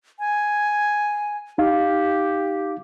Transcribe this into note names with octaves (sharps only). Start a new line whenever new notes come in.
G#5
D#4 G4 F5